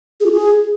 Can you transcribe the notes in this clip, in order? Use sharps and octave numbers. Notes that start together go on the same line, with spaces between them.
G#4
F4
G#4